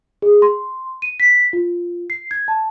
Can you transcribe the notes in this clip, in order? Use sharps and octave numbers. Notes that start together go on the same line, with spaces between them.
G#4
C6
D#7
B6
F4
C7
G#6
A5